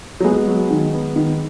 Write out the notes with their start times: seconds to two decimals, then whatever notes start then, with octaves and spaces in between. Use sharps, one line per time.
0.20 F#3
0.24 G#3 B3
0.47 F#3
0.71 D#3
0.94 B3
1.16 D#3